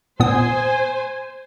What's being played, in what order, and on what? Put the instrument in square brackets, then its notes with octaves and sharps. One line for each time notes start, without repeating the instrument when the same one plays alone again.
[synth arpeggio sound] A#2 B3 D#6 [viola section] C5 G#5